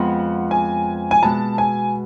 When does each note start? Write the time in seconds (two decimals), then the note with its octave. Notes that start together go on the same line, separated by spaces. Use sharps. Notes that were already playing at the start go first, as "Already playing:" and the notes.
Already playing: F2 F3 G#3 B3 F#5
0.51 G#5
1.11 G#5
1.22 B2 G#3 B3 A5
1.58 G#5